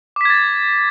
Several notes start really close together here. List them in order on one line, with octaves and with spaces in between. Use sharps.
D6 B6 G#6 A6